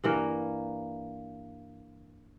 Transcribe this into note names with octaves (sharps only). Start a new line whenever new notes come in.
G2 E3 A#3 A#4